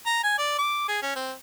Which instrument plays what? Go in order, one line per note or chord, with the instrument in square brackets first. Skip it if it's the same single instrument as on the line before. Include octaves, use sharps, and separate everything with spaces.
[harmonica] A#5
G#5
D5
D6
G#4
C#4
C4